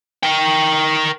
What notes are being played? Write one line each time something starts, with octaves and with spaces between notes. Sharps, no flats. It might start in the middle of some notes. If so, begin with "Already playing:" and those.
A#4 G5